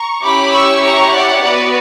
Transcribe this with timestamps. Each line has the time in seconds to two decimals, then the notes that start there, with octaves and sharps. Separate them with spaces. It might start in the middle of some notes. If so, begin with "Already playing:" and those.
Already playing: A#5 C#6
0.23 C#4 E4 G4 B5 D6
0.53 C#6 E6
0.83 A#5 C#6
1.13 D5 F#5
1.43 B3 F#4 B4 D5